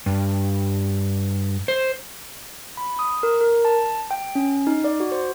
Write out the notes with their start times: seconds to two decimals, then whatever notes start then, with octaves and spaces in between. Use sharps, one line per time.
0.06 G2
1.68 C5
2.77 B5
2.99 D#6
3.23 A#4
3.41 A#4
3.65 A5
4.11 G5
4.35 C#4
4.67 D#4
4.84 D5
5.00 F#4
5.12 C5